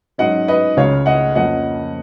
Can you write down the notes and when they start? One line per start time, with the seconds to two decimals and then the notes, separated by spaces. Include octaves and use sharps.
0.18 G#2 F#3 C#4 D#5 F#5
0.48 B4 D#5
0.77 C#2 C#3 G#3 C#4 C#5 F5
1.06 D#5 F#5
1.35 F2 F3 A#3 C#4 D#5 F#5